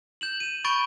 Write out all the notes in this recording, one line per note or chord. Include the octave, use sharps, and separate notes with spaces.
G6 E7 F#7
D#7 E7
B5 C#6 G6 A6 D7 G7